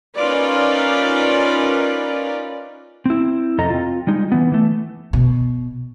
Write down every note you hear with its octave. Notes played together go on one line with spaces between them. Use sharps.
C#4 D#4 F4 A#4 B4 D5
C4 E4
F2 C3 A4 D#5 A#5
C4 F4
G3 G#3 D#4
E3 B3
E3 A3
B2